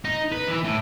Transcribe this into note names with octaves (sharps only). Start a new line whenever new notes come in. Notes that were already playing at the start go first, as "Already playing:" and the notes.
D#4
B4
E3
A2